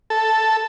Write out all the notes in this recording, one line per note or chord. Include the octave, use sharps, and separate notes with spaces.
A4